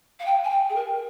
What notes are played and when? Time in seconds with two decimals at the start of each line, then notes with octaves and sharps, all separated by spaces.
0.19 F5
0.26 G5
0.44 G#5
0.50 G5
0.70 G#4
0.75 A#4